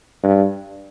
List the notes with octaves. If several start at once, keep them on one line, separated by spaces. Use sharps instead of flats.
G2